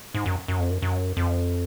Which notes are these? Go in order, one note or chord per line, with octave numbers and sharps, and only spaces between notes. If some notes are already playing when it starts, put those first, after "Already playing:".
G#2
F#2
F#2
F2
F#2
F#2
F2